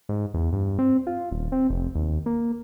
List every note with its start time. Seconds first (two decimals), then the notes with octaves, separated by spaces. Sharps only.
0.09 G#2
0.34 E2
0.53 G2
0.79 C4
1.07 F4
1.32 D#1
1.52 C4
1.70 F1
1.95 D#2
2.26 A#3